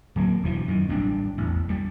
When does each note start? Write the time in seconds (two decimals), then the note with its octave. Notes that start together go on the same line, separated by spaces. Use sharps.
0.16 D1 F#3 G3 A#3
0.43 E1 D2 E3 F3
0.68 F#2 D#3
0.89 A1 G3 D4
1.38 A1 E2
1.68 G2 G3